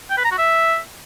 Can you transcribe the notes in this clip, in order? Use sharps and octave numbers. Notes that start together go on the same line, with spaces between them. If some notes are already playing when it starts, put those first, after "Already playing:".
G5
B4
A#5
F#4
E5